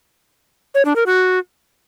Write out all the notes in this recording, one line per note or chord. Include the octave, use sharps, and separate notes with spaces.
C#5
D4
A#4
F#4